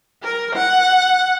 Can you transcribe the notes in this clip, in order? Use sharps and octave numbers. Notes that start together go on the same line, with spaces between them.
A#4
F#5